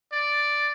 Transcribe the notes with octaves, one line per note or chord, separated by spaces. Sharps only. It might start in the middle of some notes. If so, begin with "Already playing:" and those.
D5